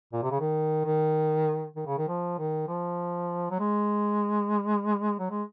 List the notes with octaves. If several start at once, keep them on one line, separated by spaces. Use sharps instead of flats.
A#2
C3
C#3
D#3
D#3
D#3
C#3
D#3
F3
D#3
F3
F#3
G#3
F#3
G#3